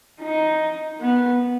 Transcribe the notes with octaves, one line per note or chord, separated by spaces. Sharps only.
D#4
B3